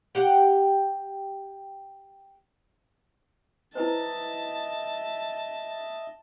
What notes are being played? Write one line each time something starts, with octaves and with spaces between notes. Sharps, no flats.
G4 F#5 G5
E4 B4 C5 D#5 E5 A5